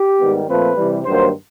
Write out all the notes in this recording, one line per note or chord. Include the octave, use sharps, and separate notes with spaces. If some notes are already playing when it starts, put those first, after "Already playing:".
Already playing: G4
G#2 D#3 G3 B3
A#2 F3 A3 C4 B4
C3 E3 G3
G2 D#3 F#3 A#3 C5